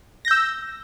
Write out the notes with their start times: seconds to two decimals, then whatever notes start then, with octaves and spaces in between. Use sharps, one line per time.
0.25 A#6
0.28 G6
0.31 E6